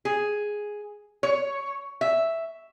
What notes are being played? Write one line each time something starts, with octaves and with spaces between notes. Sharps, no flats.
G#4
C#5
E5